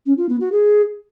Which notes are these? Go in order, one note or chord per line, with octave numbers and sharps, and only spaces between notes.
C#4
F4
B3
F#4
G#4